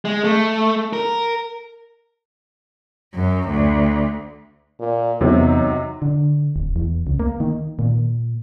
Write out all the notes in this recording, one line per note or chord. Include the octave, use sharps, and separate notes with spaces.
G#3
A3
A#4
F#2
D2
A#2
E2 C3 F#3 D#4
D3
D#1
E2
C#2
A#3
D#3
A#2